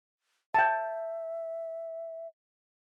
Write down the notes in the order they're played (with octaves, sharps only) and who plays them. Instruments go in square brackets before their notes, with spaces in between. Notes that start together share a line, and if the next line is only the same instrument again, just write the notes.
[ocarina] E5 [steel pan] G5 A5